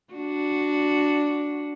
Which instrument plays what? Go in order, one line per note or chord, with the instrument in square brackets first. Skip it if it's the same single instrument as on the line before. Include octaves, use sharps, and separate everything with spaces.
[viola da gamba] D4 F#4